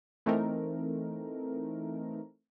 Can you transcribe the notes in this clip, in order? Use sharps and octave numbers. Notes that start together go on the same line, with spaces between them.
E3 A3 C4 D#4 A#4